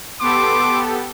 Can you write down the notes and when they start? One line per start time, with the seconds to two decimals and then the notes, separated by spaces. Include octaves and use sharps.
0.21 B3 G4 A4 C6 D6